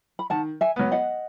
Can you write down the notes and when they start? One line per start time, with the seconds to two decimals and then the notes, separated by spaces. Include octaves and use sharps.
0.19 B5
0.30 D#3 F#5 A5
0.61 E5 G#5
0.76 F#3 B3
0.92 D#5 F#5